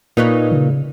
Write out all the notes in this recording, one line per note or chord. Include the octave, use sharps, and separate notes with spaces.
A#2 D#4 B4 C#5
C#3